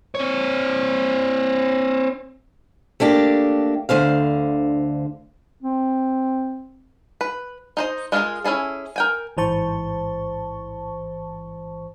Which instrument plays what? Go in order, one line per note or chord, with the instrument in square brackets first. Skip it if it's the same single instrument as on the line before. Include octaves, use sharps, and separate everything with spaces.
[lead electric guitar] C4 C#5
[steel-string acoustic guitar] A3 A#3 D4 G4
D2 D3 C5 F5
[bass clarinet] C4
[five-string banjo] B4
D#4 C5 D#5
G#3 F4 F#4 G#4 A#4
C#4 E4 G#4 A4
A#4 G5 G#5
[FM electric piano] A1 G#2 E3 C5 A5 C#6